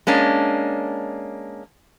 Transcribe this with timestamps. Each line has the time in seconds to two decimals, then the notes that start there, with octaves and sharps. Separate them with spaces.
0.07 G#3 A#3 C#4 D4